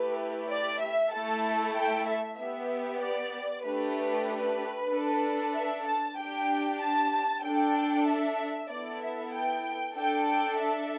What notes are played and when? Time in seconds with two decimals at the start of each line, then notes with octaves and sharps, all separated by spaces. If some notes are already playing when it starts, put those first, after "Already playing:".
Already playing: A3 E4 G4 B4
0.50 D5
0.80 E5
1.12 A3 E4 A4 A5
1.75 G5
2.07 E5
2.38 B3 G4 E5
3.02 D5
3.64 A3 D4 G4 B4
4.92 D4 A4
5.55 E5
5.86 A5
6.17 D4 G4 G5
6.81 A5
7.44 D4 A4 G5
8.06 E5
8.70 B3 E4 A4 D5
9.02 E5
9.33 G5
9.96 D4 A4 G5
10.28 G5
10.59 E5